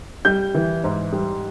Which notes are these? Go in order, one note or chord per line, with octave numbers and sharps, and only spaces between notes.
G3 G6
E3
G#2
G3